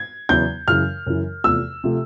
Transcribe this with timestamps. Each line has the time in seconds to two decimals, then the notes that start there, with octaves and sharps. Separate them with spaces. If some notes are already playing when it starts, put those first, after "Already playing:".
Already playing: G#6
0.29 E2 C#3 F#3 B3 E4 G6
0.68 F#2 C#3 E3 F6
1.06 F#2 C#3 E3
1.44 E2 C3 F3 A3 E6
1.84 C3 F3 A3